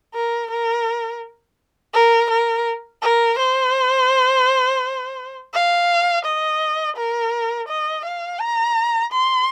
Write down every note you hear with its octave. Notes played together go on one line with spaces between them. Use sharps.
A#4
A#4
A#4
A#4
A#4
C5
F5
D#5
A#4
D#5
F5
A#5
C6